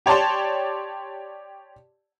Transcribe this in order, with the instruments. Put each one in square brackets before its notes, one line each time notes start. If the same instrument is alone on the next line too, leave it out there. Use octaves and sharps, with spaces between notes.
[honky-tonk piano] G4 C#5 D5 A5 C6